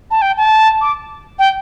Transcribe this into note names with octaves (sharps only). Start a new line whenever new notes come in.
A5
G5
A5
D6
G5